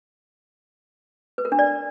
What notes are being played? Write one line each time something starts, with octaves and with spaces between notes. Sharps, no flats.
B4
A#4
D4
D5